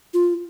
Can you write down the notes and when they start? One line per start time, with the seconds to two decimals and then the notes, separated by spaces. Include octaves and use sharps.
0.14 F4